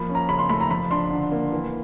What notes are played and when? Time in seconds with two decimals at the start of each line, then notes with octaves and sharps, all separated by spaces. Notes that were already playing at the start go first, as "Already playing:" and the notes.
Already playing: F3 A#3 B5
0.09 C#4
0.15 A#5
0.29 C#3 B5
0.39 C6
0.49 A3 B5
0.60 A#5
0.70 F3 B5
0.91 D4 C6
1.11 D3
1.32 A#3
1.52 E3